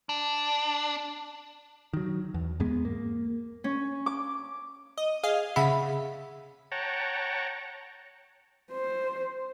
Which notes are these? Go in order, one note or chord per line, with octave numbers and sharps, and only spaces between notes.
D4
D#3 F#3
E2
E2 G#2 G#3 B3
A#3
C#4
D6
D#5
G#4 D#5 F5
C#3 G#4 E5 F#5 B5
C#5 F#5 G5 A5 A#5
C5